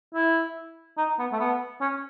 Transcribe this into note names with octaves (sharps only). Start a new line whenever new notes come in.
E4
D#4
B3
A3
B3
C#4